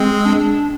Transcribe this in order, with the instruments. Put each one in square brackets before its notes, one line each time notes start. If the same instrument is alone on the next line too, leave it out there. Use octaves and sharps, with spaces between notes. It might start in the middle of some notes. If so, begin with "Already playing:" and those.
Already playing: [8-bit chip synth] G#3 [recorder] C4
[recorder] D4